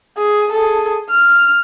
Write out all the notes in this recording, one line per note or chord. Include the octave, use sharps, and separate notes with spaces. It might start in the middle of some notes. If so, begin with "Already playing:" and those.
G#4
G#4 A4
F6